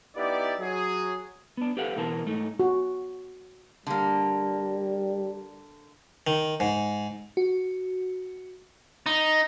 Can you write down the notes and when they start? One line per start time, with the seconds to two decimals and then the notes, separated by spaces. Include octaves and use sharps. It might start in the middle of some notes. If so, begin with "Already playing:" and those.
0.15 B3 D#4 E4 G4 D5
0.59 F#3 G#4
1.57 B3 D4
1.77 G4 A4 B4 C5 F5 F#5
1.96 B2 E3 B3 A#4 C5 A5
2.26 G#2 A3 D#4
2.60 F#4
3.87 D3 G3 A#3
6.27 D#3
6.60 G#2
7.37 F#4
9.06 D#4